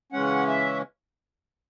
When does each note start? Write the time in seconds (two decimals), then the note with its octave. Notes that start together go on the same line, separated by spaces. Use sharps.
0.12 C#3 E3 G#3 C#4 F#5
0.48 E5